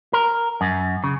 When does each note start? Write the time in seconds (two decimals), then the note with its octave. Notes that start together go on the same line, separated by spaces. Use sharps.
0.13 A#4
0.61 F#2
1.04 C#3